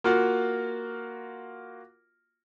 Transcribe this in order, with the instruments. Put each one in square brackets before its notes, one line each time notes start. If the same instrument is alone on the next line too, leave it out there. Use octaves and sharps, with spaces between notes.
[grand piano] A#3 F4 F#4